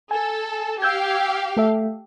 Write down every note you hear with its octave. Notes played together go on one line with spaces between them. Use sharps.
A4 G#5
G4 F5 E6 G6 G#6
A3 A4 E5